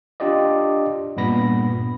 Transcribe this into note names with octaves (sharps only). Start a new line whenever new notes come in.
D4 F4 G4 D5 D#5
G2 A#2 B3 B5 A#6